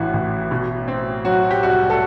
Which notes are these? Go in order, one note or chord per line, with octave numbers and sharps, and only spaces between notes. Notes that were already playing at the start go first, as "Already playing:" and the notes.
Already playing: A1 A2 E3 F#4
A1
B2
C4
F#3 F#4
G4
C2 F#4
A4